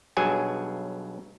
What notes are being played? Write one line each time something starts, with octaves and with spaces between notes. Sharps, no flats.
B1 G2 F#3 G#4 G#5